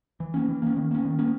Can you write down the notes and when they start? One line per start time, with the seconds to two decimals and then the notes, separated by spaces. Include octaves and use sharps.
0.20 E3
0.34 A#3 C#4
0.48 E3
0.62 A#3 C#4
0.77 D#3
0.91 A#3 C#4
1.05 D#3
1.19 A#3 C#4